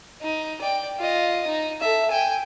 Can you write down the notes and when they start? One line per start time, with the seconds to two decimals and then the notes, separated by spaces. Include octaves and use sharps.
0.21 D#4
0.61 D5 G5
0.98 F4 D#5
1.47 D#4
1.80 A4 E5
2.10 G5 G#5